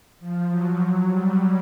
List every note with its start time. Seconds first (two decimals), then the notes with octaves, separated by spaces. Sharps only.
0.19 F3
0.48 F#3
0.78 F#3
1.06 G3